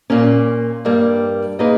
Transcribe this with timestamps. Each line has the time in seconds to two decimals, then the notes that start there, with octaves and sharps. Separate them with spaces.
0.10 A#2 A#3 C#4
0.85 G2 G3 A#3
1.59 A#3 D#4 G#4 B4 D#5